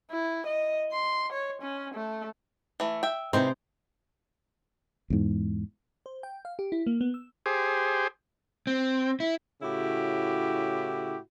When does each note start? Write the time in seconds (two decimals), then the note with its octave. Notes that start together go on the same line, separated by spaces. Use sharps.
0.11 E4
0.47 D#5
0.92 C6
1.32 C#5
1.62 C#4
1.95 A3
2.80 E3 A3
3.03 E5 G5
3.33 C3 E3 C4 D#4 C5
5.10 E2 G#2
6.06 C5
6.23 G5
6.45 F5
6.59 G4
6.72 E4
6.86 A#3
7.01 B3
7.14 E6
7.46 G4 G#4 C5
8.67 C4
9.20 E4
9.62 A2 C#3 E4 F#4 G4